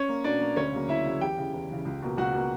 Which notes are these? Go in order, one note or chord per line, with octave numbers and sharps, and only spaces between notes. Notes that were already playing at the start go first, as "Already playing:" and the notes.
Already playing: C#4 C#5
A#3
B2 D4 D5
A#3
D2 C#4 C#5
C#3 F#3 A#3
D2 E4 E5
C#3 F#3 A#3
E2 G4 G5
C#3 E3
E2
C#3 E3
C#2
B2 A#3
C#2 F#4 F#5
B2 A#3